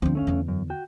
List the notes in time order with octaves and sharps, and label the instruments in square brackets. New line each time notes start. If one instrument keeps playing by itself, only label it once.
[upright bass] D2 D4 [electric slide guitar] F3 C4
[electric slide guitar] A3 C#4 F5
[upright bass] E2 D3
[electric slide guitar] F#2
F#4 G5